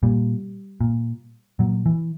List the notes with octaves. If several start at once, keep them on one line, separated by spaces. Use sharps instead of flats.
A#2 G3
A#2
A#2 F#3
E3